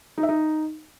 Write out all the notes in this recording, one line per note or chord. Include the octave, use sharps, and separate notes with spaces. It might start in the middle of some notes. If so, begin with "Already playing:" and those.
D#4
E5
D#4